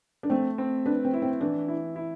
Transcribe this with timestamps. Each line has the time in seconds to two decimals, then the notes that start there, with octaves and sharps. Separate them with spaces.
0.23 D4
0.30 A3 C4
0.58 C4
0.86 D4 B4
1.05 C4
1.13 E4
1.22 C4
1.41 E3 D4
1.68 E4
1.96 E4